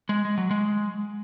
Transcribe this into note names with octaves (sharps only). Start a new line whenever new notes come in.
G#3
G#3
F#3
G#3